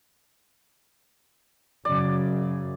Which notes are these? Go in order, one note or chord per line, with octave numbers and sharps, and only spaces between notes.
F#2 C#3 D5